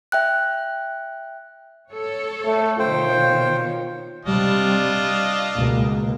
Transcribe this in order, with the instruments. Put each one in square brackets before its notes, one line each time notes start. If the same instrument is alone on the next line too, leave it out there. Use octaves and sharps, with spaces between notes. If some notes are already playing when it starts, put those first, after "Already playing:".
[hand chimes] E5 G5 F#6
[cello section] A4 C#5
[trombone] A3
[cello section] B2 D#3 C#5 [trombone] F4 [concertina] C5 G5
[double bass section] C3 G3 [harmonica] D4 F4 D#5
[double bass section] C#2 B2 A#3